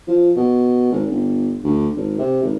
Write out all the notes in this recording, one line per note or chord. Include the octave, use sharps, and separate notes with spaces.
F3
B2
G#1
G1
D2
G#1
C3
G#1